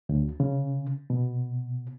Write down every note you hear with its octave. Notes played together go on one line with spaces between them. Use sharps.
D2
C#3
B2